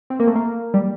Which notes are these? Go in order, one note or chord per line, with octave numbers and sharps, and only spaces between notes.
C4
A#3
A3
A#3
G3